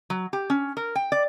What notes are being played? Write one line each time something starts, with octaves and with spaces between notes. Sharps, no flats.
F#3
G4
C#4
A#4
G5
D5